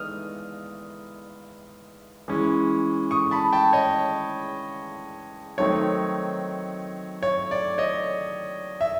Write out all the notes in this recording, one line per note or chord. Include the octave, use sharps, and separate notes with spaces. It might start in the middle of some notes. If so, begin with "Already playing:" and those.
Already playing: E3 G#3 B3 D#4 D#6 F6
E3 G#3 C#4
C#6 D#6
A5 B5
G5 A5
C#5 D#5
D#3 F#3 A3 C4 D#4 C#5
C#5
D5
C#5 D#5
E5